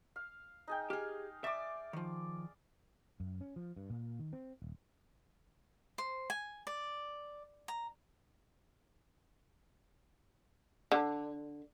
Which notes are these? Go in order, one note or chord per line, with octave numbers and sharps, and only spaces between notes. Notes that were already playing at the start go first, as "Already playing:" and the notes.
F5
D#4 G#4 G5
G4 G#4 F5
D5 E5 D6
D#3 F3
F#2
C#4
F3
G2
A#2
D#3
C4
D#1
C5
G#5
D5
A#5
D3